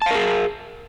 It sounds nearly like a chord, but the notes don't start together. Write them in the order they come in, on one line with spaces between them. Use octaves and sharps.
A5 F5 A#4 G#4